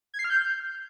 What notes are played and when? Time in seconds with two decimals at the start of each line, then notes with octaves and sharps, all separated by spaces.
0.14 G#6
0.19 C7
0.24 F6
0.30 G6